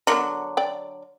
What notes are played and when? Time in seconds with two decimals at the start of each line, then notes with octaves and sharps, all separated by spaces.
0.07 D3 F#3 B3 A#4 A#5
0.57 D5 G5